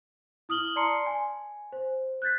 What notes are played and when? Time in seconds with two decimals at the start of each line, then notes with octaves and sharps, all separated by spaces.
0.49 E4 D#6 F6 F#7 G7
0.76 D5 A5 A#5 C6 C7 C#7
1.06 G#5
1.72 C5
2.22 F#6 G6 A6 B6